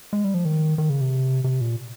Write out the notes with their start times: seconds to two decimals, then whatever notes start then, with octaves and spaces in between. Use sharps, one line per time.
0.13 G#3
0.24 G3
0.34 F3
0.45 D#3
0.78 D#3
0.90 C#3
1.01 C3
1.44 C3
1.61 A#2